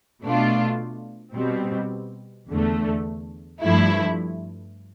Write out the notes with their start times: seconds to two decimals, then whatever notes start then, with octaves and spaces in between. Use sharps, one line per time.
0.23 B2 A3 D4 F4
1.35 B2 G3 C4
2.48 E2 D3 A3
3.62 G2 F3 A3 E4